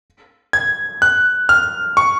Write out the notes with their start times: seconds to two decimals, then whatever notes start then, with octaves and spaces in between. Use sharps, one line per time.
0.53 G#6
1.02 F#6
1.49 F6
1.97 C#6